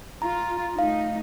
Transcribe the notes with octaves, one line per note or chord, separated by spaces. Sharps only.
F4 A#5
A3 D#4 F5